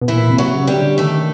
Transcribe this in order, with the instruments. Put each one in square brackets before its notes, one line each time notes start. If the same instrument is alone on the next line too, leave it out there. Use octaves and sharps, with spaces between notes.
[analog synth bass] B2
[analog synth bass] A#2 [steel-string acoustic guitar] E3 E4
[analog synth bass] C3
[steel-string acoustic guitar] F#3 F#4
[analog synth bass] C#3
[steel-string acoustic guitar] G3 G4
[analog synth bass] D3
[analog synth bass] D#3 [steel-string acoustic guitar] A3 A4